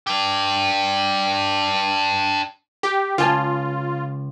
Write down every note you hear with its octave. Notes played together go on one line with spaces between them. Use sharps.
D4 G4
G4
C#2 F4 G#5 A5